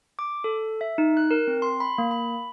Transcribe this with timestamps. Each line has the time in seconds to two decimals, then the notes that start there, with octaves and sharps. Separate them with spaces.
0.19 D6
0.44 A4
0.81 E5
0.98 D#4
1.17 F#6
1.31 A#4
1.47 C4
1.62 C6
1.80 B5
1.98 A#3
2.11 B5